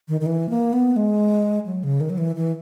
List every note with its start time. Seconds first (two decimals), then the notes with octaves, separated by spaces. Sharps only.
0.08 D#3
0.21 D#3
0.26 E3
0.50 A#3
0.73 B3
0.96 G#3
1.66 F#3
1.84 C#3
2.00 D#3
2.10 F#3
2.18 E3
2.36 E3